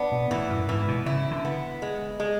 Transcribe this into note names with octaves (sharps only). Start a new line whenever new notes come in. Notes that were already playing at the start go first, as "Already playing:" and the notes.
Already playing: B3 D4
B2
A2 E3
F#2
G#2 E3
B2
C#3 E4
D3
B3
G#3
G#3